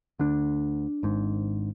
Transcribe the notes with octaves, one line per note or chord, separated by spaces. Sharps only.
D2 D3 D4
G#1 G#2